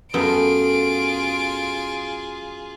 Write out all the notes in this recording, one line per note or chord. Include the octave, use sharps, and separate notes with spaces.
F#2 A3 B3 F4 G#4 A4 D7